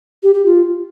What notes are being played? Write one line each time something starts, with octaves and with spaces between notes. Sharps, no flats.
G4
G4
F4